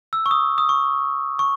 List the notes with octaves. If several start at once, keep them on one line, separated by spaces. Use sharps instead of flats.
E6
C#6
D#6
D#6
C#6
C#6